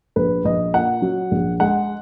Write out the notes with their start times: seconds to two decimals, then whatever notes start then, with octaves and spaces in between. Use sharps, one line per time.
0.16 A#1 B4
0.44 A#1 D#5
0.74 A#2 F#5
1.02 F#3
1.31 A#1
1.60 G#3 F#5